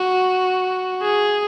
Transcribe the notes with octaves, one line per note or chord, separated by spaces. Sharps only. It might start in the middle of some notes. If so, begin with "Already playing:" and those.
Already playing: F#4
G#4